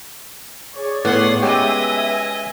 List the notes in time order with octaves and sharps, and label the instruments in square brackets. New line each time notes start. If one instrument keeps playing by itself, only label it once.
[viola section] G#4 C#5 D5
[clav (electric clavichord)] A2 [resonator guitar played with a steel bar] B3 [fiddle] F#5 C6
[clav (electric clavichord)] G#3 C#4 G4 [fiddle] B4 D#5 [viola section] E5 G#5